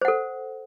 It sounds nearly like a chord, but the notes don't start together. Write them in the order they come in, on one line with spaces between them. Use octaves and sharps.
C5 F#5 A4